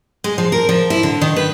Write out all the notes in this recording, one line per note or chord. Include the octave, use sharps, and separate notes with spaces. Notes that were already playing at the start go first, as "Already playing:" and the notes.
G#3
F3
A#4
F3
E4
D3
D#3
B4